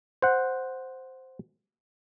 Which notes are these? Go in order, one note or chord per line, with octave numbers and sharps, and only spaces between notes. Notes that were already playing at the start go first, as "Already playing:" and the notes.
C5 F#5